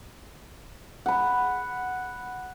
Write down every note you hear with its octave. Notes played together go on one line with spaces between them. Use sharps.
F#5 B5